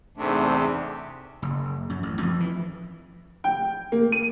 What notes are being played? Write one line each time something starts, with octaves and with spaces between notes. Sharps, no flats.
E2 G#2 C3 A3 D4
F#1
F#2
A1
F2
E3
G5
A#3
D#7